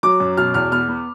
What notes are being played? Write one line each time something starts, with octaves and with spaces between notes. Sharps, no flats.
F#3 D6
F#2
B2 F6
E2 F6
B3 F6
B3